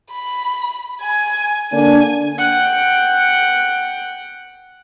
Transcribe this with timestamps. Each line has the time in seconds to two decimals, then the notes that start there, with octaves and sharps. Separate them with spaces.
0.11 B5
1.02 G#5
1.72 D3 A#3 D4 G#5
2.39 F#5 G5